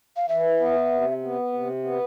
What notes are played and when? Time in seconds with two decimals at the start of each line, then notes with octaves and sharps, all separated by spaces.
0.17 F5
0.29 E3 E5
0.60 B3
0.92 C3
1.23 B3
1.53 C3
1.84 B3